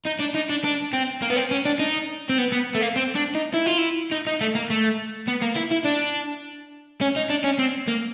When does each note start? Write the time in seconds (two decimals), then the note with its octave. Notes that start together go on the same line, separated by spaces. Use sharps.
0.06 D#4
0.20 D4
0.35 D#4
0.50 D4
0.64 D4
0.93 C4
1.22 A#3
1.30 B3
1.36 C4
1.51 C#4
1.65 D4
1.80 D#4
2.30 C4
2.38 B3
2.52 B3
2.75 A3
2.81 A#3
2.96 C4
3.15 D4
3.35 D#4
3.54 E4
3.66 F4
3.78 E4
4.11 D#4
4.27 D#4
4.41 A3
4.55 A#3
4.70 A3
5.28 B3
5.42 A#3
5.56 E4
5.72 E4
5.85 D4
7.01 C#4
7.16 D#4
7.30 D4
7.44 C#4
7.59 C4
7.88 A#3